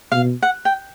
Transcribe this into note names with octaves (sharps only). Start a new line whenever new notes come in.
B2 F5
F#5
G5